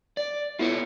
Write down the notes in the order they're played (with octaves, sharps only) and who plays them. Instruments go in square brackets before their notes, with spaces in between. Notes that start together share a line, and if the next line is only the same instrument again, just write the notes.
[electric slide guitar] D5
[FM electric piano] B3 E4 [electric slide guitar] F4 A4 C#5